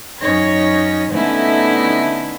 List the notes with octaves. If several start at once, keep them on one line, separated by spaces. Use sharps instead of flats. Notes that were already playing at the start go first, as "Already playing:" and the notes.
F#2 C#4 D#4 C#5 A#6
D3 A3 B3 C#4 D#4 E4